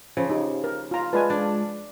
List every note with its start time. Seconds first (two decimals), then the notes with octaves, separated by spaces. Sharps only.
0.17 C#3 F3
0.30 D#4 G4
0.64 A#4
0.91 F4 A#5
1.13 G#3 F4 B4 D5 G#5 A5
1.30 D4